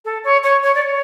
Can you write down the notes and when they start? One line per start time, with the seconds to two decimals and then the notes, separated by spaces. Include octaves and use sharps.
0.05 A4
0.24 C#5
0.43 C#5
0.63 C#5
0.74 D5
0.81 C#5